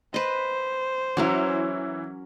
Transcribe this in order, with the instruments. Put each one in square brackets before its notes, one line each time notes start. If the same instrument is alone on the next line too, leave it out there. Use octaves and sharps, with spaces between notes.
[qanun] B4 D#5 [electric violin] C5
[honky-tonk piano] E3 E4 [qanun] F#3 C#4 A#4